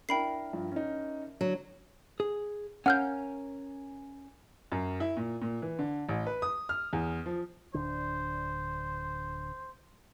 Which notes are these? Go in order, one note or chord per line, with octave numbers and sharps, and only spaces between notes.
D4 E4 A#4 G5 B5 C7
G2 F3
C#4 D#4
D3 F#3
G#4
C#4 A#4 F5 F#5 F6 G6
F#2
E4
A#2
A#2
E3
D3
A1
B4
D#6
F6
E2
F3
D1 D3 D4 C5